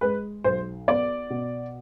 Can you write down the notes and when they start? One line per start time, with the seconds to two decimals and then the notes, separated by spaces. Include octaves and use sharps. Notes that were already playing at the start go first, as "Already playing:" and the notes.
0.01 G#3 B4
0.44 B1 C5
0.88 B3 D5
1.30 B2